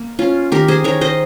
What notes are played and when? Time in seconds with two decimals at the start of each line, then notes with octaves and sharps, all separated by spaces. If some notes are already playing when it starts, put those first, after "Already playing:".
Already playing: A#3
0.19 C#4 F4
0.52 D#3 G4 A#4
0.68 G#4 C5
0.84 D#3 A#4 C#5
1.01 C5 D#5